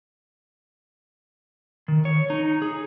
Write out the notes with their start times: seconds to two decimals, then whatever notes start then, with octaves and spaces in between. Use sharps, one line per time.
1.88 D#3
2.05 C#5
2.30 D#4
2.62 G#4